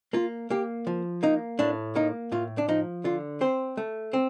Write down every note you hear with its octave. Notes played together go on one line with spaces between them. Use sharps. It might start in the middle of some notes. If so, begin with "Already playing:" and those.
A#3 F4
A#3 G4
F3
A#3 D#4
A2 D4
A#3 D#4
A2 F4
D4
F3 D#4
D3 F4
C4 C5
A3
C4